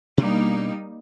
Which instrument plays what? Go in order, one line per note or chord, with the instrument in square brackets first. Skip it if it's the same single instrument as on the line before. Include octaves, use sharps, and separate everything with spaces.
[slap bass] B2 D4 [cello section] G3 A#3 D#4